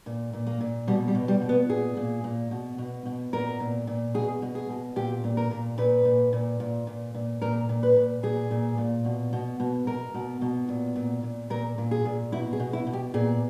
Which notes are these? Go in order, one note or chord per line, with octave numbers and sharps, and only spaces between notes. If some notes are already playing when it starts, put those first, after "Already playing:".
A#2
A#2
A#3
A#2
B2 G3
G3
B2
G3
B2
B3
A#2 G#4
A#2
A#2
B2
B2
B2
A#2 A#4
A#2
A#2
B2 G#4
B2
G#4
B2
A#2 G4
A#2
A#4
A#2
A#2 B4
A#2
A#2
A#2
A#2
A#2
A#2 A#4
A#2
B4
A#2
A#2 G#4
A#2
A#2
B2
B2
B2
B2 A#4
B2
B2
A#2
A#2
A#2
A#2 A#4
A#2
G#4
A#2
B2 E4
G#4
B2
E4
B2
G4
A#2 G#4